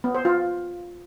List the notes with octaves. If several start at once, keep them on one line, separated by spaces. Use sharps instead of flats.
B3
C5
F4